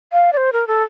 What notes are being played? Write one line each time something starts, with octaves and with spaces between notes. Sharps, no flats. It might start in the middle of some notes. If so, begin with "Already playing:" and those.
F5
D5
C5
A#4
A4